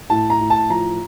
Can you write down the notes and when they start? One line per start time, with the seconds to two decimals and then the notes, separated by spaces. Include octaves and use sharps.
0.10 A2 A5
0.30 A#5
0.41 A2
0.50 A5
0.70 F3 A#5